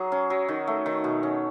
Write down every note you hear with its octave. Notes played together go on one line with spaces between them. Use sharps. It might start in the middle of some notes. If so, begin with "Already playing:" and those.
Already playing: F#3 G#4
C#4
F#3
D#3
A3
D#3
B2
C#4